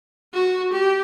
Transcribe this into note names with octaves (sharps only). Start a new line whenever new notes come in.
F#4
G4